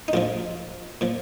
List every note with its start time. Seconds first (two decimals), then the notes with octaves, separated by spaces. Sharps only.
0.08 D#4
0.13 A#1 A#2 F3 F4
1.01 A#2 F3